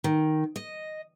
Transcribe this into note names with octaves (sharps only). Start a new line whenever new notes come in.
D#3
D#5